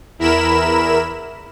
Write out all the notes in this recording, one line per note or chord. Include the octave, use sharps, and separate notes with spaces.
E2 E4 A#4 B5 E7